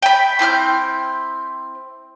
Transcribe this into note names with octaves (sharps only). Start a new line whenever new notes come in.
G5 B5
C4 E4 F6 G6